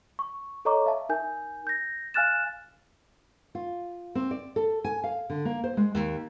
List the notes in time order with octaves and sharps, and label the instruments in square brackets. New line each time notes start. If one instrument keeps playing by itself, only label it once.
[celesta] C#6
A4 C#5 D#5 A#5 C#6 D6
E5 F5 A5
D#4 A#4 G#5 G6
G6 A#6
F5 G#5 F6 F#6 A6 E7
[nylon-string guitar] F4
C4
D5
A4
G#5
F5
D3
A#3
C5
G#3
D#2